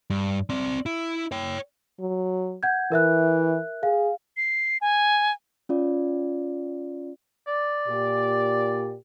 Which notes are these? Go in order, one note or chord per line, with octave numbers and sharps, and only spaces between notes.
G2
C4 D5
E4
C#5 G5
F#3
F#5 G6 G#6
E3 A#4 E5 F#6
G#4 F5
C7
G#5
C#4 F4 D5
D5
A#2 G4